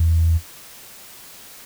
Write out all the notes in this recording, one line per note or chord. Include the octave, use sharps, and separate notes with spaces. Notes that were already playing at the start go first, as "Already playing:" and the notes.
Already playing: E2